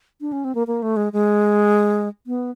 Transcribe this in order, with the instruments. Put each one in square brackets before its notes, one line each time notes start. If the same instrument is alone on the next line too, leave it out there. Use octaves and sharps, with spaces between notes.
[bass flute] D4
C#4
C4
A#3
A#3
A3
G#3
G#3
B3